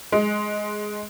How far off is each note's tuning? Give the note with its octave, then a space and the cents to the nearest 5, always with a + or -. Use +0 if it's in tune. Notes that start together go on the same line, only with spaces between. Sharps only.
G#3 +5